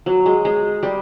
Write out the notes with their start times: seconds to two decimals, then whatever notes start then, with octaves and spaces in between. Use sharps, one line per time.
0.06 F#3
0.26 G#3
0.45 G#3
0.83 G3